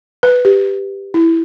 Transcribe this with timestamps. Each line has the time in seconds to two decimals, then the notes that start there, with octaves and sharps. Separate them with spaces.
0.23 B4
0.45 G4
1.14 E4